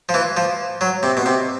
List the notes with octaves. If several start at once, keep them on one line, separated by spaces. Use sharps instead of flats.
F3
E3
F3
F#3
C3
B2
C3